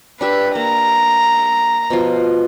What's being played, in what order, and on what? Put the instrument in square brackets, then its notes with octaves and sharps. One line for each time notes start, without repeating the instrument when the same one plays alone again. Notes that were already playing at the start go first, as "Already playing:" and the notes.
[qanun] D4 G4 E5 [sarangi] B4
[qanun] A#3 [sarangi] A#5
[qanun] B2 F3 F4